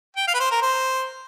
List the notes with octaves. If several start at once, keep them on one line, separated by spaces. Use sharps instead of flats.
G5
F5
B4
C5
A#4
C5